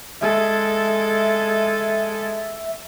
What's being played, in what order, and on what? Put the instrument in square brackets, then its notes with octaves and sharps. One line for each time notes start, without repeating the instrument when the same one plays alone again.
[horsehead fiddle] G#3 A4 [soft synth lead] E5